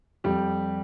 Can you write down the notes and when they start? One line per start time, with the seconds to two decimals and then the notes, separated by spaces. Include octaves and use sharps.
0.24 F2 G3 G4